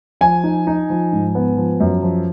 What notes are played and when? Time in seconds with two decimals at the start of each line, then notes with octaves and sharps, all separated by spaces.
0.21 F3 G#5
0.44 D#4
0.67 D#4
0.90 F3
1.13 G#2
1.35 B3
1.57 F3
1.80 F#2
2.03 F3